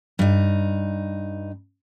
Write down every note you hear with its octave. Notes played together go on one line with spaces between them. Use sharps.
G2 D#4